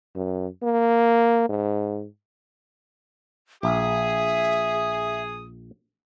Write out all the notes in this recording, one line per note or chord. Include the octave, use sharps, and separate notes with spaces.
F#2
A#3
G#2
A#1 G#4 E5 D#6